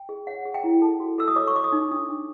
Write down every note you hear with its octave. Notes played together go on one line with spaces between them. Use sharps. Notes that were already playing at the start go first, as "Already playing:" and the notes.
Already playing: G5
G#4
C#5 F#5
G#4
G5
E4
A4 A5
F#4
A4 E6
D#6
C#5 D6
C#6
C#5 D6
D#6
D#4
D4 D#6
D4